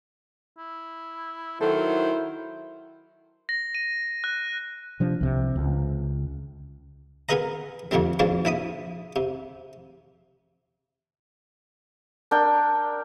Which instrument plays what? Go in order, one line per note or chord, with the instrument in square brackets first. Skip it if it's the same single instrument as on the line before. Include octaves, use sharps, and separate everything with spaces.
[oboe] E4
[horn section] D#3 F#3 [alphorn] E4 [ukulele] A4 [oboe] C5
[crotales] A#6
D#7
F#6
[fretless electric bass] C3 F3 D4
C2 C3
C#2
[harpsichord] B3 G#4 A#4 B4 D#5 A#5
F2 A#2 D3 G3 C4
G#2 B2 F3 G#3 C4 D4
A#1 E4 B5 D#6
C3
[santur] D4 A#4 G5